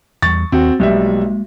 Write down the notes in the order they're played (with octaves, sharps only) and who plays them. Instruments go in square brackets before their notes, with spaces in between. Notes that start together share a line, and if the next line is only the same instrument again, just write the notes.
[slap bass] E2 G3 [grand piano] C#6 A6
[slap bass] D#2 [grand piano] C4 F#4
[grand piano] B1 G3 E5 [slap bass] G#3 A#3